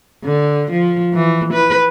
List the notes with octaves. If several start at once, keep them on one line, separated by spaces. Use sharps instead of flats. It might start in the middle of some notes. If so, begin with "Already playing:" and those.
D3
F3
E3
B4